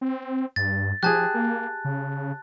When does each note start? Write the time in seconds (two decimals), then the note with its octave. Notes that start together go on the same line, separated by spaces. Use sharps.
0.01 C4
0.56 G2 A6
1.03 F3 G4 G#4 A5 F#6
1.34 A#3
1.85 C#3